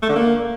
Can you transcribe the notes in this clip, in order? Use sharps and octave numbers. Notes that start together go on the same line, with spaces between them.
A3
D3
A#3